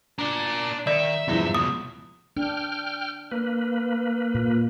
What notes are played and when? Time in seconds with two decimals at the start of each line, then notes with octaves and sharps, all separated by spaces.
0.19 D4 A#4 D5
0.87 D#3 D5 E5
1.28 E2 G2 F3 D#4
1.54 C#2 B2 D#6
2.37 D4 G5 F6
3.32 A#3 B4
4.35 A#2